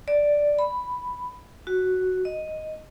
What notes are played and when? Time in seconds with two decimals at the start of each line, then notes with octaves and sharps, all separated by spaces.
0.08 D5
0.59 B5
1.67 F#4
2.25 D#5